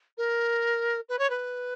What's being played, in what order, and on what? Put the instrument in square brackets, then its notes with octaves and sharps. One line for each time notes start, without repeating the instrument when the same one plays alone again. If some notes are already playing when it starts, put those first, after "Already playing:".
[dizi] A#4
B4
C#5
B4